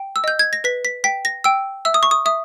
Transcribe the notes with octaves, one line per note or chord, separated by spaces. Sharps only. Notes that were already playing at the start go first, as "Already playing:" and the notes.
Already playing: G5
E6
D#5 G6
G#6
A#6
B4 B6
B6
G5 B6
A#6
G5 E6
E5 E6
D#6
C#6
D#6
E5 D#6